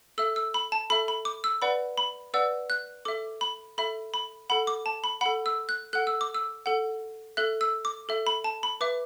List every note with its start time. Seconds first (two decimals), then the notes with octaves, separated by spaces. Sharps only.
0.18 A4 E5 E6
0.36 E6
0.54 B5
0.72 A5
0.90 A4 E5 B5
1.08 B5
1.25 D6
1.44 E6
1.62 B4 D5 F#5 B5
1.98 B5
2.34 B4 D5 F#5 E6
2.70 F#6
3.05 A4 E5 D6
3.41 B5
3.78 A4 E5 B5
4.14 B5
4.50 A4 F#5 B5
4.67 D6
4.86 A5
5.04 B5
5.21 A4 F#5 B5
5.46 E6
5.69 F#6
5.93 A4 F#5 F#6
6.07 E6
6.21 D6
6.34 E6
6.66 A4 F#5
7.37 A4 E5 F#6
7.61 E6
7.85 D6
8.09 A4 E5
8.27 B5
8.44 A5
8.63 B5
8.81 B4 E5 D6